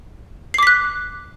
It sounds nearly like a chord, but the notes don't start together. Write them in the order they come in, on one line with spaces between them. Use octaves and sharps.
C7 D6 B6 F#6